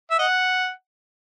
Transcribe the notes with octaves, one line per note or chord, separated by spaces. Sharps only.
E5
D#5 F#5